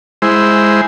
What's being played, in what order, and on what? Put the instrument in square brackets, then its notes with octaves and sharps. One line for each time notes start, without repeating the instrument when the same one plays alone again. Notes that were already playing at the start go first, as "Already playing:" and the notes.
[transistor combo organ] G#3 E4 C5